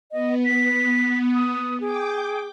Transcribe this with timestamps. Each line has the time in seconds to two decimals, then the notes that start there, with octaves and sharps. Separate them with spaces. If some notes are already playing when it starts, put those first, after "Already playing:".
0.12 B3 D#5
0.45 B6
1.35 D#6
1.81 G#4 G5 D6